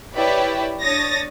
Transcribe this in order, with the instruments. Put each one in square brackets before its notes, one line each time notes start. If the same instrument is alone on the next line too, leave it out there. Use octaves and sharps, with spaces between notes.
[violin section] E4 G4 B4 C#5 D5 E5
D4 C#5 D#6 A6 A#6